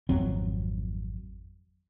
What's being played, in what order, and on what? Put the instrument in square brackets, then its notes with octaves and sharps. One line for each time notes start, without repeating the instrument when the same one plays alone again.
[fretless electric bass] G#1 F2 F#3 C4